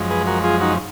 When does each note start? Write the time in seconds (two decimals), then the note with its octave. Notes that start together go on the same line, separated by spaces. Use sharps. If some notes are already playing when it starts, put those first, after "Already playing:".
Already playing: F#2 F3 G#3
0.10 G#4 B4
0.27 F#4 A#4
0.44 F4 G#4
0.61 D#4 F#4